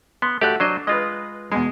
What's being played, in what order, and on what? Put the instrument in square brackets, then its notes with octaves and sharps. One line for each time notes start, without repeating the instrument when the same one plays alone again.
[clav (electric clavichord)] B3 [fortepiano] C6
[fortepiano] A3 F#4 F#6 [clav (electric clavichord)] G4 D5
[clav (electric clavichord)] F#3 C5 D#5 [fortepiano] D4
[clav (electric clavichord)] G#3 F4 [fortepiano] B4 D#5
[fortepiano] E2 B2 G#3